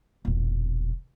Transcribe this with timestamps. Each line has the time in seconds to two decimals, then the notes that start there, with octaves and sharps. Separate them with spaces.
0.25 E1 A#1